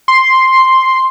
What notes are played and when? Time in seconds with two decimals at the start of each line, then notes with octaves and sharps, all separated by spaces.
0.08 C6